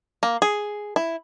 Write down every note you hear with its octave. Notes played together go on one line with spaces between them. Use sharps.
A#3
G#4
E4